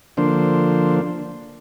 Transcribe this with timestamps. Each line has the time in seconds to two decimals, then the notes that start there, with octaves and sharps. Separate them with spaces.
0.17 D3 F3 A#3 D4 C5